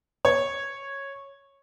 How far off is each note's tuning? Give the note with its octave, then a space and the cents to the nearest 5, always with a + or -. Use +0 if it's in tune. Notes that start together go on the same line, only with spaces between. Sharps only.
C#5 -10